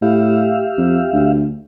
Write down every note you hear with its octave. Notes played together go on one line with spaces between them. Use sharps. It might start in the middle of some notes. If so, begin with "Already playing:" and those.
A2 G4 E5 F5
F2
D2